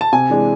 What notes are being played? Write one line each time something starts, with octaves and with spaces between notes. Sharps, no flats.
A5
C3 G#5
E3 G#3 D4